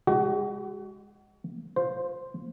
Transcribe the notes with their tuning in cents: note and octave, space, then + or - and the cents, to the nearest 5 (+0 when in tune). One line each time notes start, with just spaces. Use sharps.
G#3 -20 F#4 +30
F4 +20 C5 +0